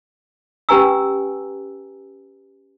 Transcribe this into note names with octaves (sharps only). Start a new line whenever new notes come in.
C#4 G4 B4 G#5 A#5 E6